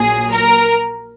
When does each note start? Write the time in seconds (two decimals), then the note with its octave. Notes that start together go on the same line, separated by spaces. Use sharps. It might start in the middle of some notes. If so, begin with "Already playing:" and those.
Already playing: A#1 A#2 F#3 G#4
0.31 A#4